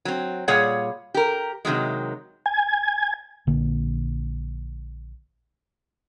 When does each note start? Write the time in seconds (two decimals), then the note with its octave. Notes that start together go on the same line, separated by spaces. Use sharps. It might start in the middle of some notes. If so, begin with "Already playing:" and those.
0.05 F#3 C4
0.48 A#2 G3 G#4 C#5 F#5
1.14 G4 A#4
1.65 C3 D#3 F#3 G#3
2.46 G#5
3.47 A#1 D3 A#3